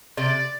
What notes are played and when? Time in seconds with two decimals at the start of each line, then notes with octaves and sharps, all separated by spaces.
0.17 C3 D5